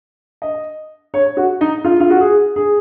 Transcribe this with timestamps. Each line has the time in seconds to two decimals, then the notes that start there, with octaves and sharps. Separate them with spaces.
0.42 D#5
1.14 C#5
1.37 F#4
1.61 D#4
1.85 F4
2.00 F4
2.10 F#4
2.21 G#4
2.56 G#4